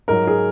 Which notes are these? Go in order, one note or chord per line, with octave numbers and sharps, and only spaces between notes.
G#2 F#3 A#4
G#4